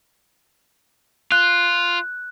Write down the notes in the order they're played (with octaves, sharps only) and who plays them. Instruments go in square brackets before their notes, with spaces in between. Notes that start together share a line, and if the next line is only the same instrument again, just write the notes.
[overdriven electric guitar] F4 [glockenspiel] F#6